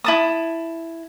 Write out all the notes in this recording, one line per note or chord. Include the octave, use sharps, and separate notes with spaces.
E4 A5 D#6